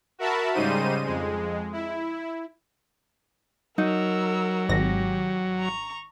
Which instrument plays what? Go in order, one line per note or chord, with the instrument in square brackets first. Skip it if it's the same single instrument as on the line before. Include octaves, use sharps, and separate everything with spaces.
[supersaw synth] F#4 A#4 E5 A5 B5
G#2 C#3 G3 D#4 C5 D#7
F2 G#3
E4
[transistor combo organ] F#3 [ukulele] D#4 [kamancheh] A#4 E6
[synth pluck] G#1 A#6 [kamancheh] G4
[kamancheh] A#5 C#6